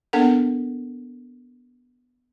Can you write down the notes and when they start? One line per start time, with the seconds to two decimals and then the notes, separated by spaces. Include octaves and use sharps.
0.13 A#3 B3 D4 A4 A#4 F#5